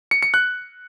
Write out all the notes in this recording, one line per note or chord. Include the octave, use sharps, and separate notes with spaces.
C#7
C#7
F#6